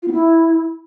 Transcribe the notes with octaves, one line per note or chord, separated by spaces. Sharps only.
F4
B3
E4